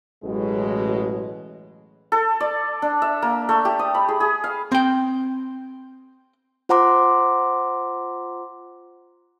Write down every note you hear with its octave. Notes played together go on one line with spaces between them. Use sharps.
A1 B2 F#3 G#3
A4
D5
D4
E5
A#3
A3
G4
D#6
B5
G#4
G#4
F5
C4 G5
F4 C5 F#5 A#5 C6 D6